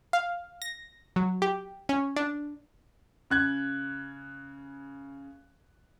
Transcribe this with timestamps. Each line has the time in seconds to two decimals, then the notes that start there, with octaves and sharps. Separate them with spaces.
0.13 F5
0.62 A#6
1.16 F#3
1.42 G4
1.89 C#4
2.16 D4
3.30 C#3 F#6 G#6